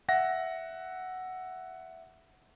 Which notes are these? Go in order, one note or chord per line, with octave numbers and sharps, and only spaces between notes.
E5 F#5 A#6